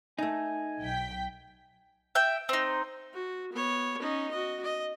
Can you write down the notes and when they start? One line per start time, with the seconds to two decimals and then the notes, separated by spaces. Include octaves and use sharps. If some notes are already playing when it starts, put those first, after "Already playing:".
0.19 A3 D#4 G#5
0.81 B1 G5 B6
2.15 E5 G5
2.49 C4 D#4
3.13 F#4
3.53 B3 C#5
4.01 C#4 D#4
4.31 F#4 D#5
4.63 D#5